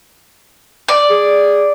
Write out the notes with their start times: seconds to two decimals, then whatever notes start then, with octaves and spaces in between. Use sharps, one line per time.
0.88 D5
1.10 G#4